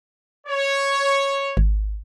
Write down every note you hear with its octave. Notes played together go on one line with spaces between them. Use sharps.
C#5
G#1